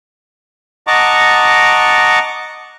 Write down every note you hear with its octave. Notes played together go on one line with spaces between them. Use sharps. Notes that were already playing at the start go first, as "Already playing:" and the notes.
D#5 F#5 A5 A#5 C#6 D6